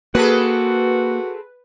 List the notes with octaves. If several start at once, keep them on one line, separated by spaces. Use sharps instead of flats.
A#3 C4 F#4 G#4 A4 B4